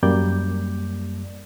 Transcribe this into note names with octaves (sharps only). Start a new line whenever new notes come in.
F#2 G3 A#3 D5 G6